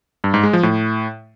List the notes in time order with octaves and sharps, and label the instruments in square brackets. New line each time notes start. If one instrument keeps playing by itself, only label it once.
[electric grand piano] G2
G#2
G#3
F3
A2